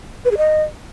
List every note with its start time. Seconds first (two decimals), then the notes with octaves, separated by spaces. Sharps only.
0.25 B4
0.31 G#4
0.37 D#5